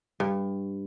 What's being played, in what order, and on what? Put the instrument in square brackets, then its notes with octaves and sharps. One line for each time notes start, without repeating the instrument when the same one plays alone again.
[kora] G2